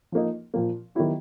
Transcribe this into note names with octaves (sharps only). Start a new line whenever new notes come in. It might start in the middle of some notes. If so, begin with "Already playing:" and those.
F3 A#3 D#4
A#2 F3 A#3
D#3 F#3 B3 E4 G4